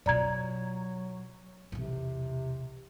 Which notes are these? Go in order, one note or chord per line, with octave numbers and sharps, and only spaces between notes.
B2 F#3 F4 D5 A#5 G#6
B1 E2 C3